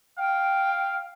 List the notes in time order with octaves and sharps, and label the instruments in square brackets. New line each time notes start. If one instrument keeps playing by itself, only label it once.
[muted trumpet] F5 [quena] G5